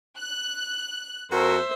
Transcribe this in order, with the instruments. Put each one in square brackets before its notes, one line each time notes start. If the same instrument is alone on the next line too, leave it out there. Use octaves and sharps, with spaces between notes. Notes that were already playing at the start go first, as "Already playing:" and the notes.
[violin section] F#6
[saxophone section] F2 F#4 [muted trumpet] A#4 [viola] C5 E5